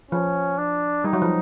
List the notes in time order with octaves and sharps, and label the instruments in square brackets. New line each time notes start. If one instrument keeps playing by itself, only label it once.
[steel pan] F3 [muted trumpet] C#4
[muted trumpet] D4
[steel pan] G3 [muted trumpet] D#4
[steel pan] F#3
F3